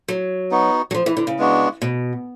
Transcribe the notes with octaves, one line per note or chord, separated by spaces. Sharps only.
F#3
B3 D#4 F#4
F#3
F3
E3
D3
C#3
G#3 B3 D4 F#4
B2